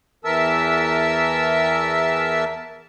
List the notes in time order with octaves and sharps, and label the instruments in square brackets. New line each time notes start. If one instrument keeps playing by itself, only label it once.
[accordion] E2 E3 A#4 E5 A5 E6